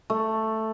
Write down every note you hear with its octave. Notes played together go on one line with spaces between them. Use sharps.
A3